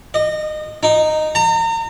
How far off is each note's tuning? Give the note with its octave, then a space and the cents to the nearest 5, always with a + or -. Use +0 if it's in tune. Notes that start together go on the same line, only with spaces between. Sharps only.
D#5 -25
D#4 -10
A#5 -35